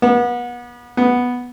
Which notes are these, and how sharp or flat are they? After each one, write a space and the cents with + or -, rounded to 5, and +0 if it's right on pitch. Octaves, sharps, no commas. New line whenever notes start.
B3 -30
B3 -5